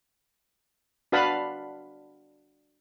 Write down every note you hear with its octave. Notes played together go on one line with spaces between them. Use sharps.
D4 F#4 B4 F5 A5 B5